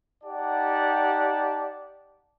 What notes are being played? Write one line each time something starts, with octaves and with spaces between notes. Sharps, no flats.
D#4 G4 D5 F#5 A5